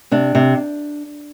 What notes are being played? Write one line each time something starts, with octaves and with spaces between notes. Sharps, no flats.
C3 D4
C3